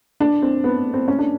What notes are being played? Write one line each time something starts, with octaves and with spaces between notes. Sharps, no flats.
D4
C4
B3
C4
C#4
D4